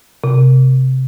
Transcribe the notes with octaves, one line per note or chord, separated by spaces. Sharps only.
C3